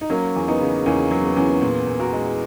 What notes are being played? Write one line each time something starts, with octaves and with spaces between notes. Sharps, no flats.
D#4
F#3 A#3 C#4
E2
B3 D#4
C#3
E2 A#3 C#4
F#3
B3
E2 C#4
B3
A#2 B3
A#2
F#4 A#4
G#3